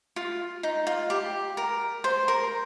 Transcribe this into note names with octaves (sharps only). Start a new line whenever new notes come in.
F4
D#4
F4
G4
A#4
C5
A#4